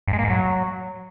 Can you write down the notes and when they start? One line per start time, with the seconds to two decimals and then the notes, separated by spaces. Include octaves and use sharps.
0.08 G2
0.13 G#3
0.19 A#3
0.24 G#2
0.30 F#3